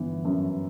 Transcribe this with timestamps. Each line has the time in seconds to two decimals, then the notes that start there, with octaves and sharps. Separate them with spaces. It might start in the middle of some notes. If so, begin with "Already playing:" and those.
Already playing: G1 E3 B3
0.25 F#2